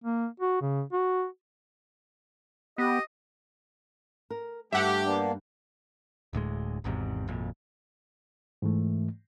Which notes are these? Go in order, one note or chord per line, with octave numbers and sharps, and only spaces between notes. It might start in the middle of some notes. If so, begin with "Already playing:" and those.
A#3
F#4
C#3
F#4
B3 G4 D#5
A#4
G2 A3 G4 E5 F#5
A#3 B3 D4
D1 D2 A2 G#3
G#1 E2 G#2 C3
G#1 F2 A#2
G#2 E3 A3